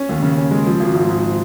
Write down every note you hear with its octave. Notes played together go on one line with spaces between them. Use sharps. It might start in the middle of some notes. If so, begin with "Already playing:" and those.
Already playing: C#4
D#2
C#3
C#4
G#3
F3
G#1
G#2
G#2